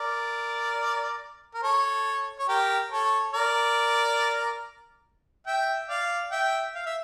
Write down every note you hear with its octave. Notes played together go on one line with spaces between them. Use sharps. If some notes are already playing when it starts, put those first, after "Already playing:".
Already playing: A#4 D5
A#4
A4 C#5
C#5
G4 A#4
A4 C#5
A#4 D5
E5 G5
D5 F5
E5 G5
F5
E5